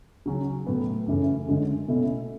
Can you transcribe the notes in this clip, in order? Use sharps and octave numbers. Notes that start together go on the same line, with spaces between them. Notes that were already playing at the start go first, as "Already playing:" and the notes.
C#3 F#3 C#4
A2 F#3 B3
F#2 C#3 E3 A3 C#4
F#2 D3 G#3 C#4
B2 A3 C#4 E4